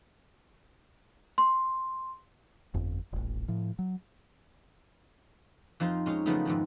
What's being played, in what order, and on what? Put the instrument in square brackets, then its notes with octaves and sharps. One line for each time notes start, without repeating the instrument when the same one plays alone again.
[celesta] C6
[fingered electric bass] G1 F2
D#1 A1
A2 F3
F#3
[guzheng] F2 F3 D#4 F5 C6
G#3 C#4 D#4
C#3 F3 F#3 A3 B3 D#4
F2 G#2 D#3